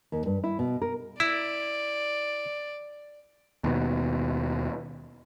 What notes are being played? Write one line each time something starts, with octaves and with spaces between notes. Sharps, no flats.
D#2
G2
E4
B2
A#4
E4 D5
D#2 B2